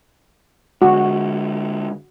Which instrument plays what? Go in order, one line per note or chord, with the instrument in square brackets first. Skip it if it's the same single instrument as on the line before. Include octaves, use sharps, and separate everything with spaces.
[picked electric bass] D3 G#3 [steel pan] F#4